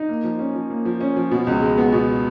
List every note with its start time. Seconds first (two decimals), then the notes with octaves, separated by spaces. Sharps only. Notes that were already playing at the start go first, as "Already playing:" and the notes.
Already playing: D#4
0.09 A#3
0.24 F3
0.39 C#4
0.55 F3
0.70 A#3
0.85 F3
1.01 C#4
1.17 F3
1.31 B2
1.47 C#2
1.62 G#3
1.77 B3
1.92 B2